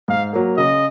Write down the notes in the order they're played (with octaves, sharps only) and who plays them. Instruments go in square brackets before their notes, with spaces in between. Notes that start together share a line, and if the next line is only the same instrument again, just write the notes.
[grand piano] G#2 [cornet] F5
[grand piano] F#3 A#3
[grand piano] C#3 [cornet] D#5